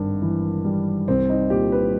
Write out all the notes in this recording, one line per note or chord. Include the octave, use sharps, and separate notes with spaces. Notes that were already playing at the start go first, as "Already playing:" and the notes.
Already playing: G#1 G2
E3
G3
C2 C4
D#4
A#2 G4
B4